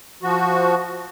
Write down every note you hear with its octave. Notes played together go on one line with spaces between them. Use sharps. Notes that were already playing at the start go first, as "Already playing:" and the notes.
F3 F#4